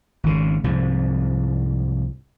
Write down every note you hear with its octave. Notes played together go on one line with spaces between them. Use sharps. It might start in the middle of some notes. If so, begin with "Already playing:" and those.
G#1 C#3
C2 G#2 F3